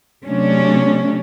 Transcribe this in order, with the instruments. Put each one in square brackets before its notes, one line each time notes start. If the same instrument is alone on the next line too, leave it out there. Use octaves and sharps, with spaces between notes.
[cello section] C3 F#3 A3 C#4 D4